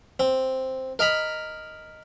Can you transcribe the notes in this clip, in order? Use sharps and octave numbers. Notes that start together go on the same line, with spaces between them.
C4
A#4 D#5 A#5 B5